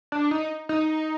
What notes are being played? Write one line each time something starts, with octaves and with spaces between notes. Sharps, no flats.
D4
D#4
D#4